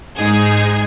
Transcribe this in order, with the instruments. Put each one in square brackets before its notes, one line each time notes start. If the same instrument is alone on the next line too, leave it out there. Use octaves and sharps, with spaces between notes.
[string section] G#2 G#3 D#4 G#4 G#6